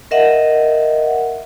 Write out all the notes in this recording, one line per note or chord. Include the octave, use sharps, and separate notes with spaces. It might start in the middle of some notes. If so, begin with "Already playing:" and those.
A#4 D#5 E5 F#5